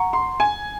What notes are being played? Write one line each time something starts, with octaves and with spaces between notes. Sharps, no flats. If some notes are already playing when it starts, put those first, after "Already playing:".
Already playing: F#5 A#5 C#6
C6
G#5